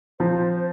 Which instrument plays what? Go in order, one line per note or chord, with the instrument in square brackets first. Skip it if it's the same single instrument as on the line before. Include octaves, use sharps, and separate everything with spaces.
[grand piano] F3 C4 [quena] C5